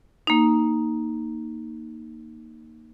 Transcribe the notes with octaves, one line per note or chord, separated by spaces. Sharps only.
A#3 D#4